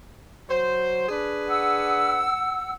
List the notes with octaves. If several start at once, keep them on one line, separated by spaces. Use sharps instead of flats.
F#3 C5
D4 G#4 B4
F#5 E6